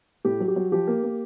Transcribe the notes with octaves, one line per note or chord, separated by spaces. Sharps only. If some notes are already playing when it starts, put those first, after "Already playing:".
A2 G4
F#3
G4
F#3
F3 G4
A#3
A#3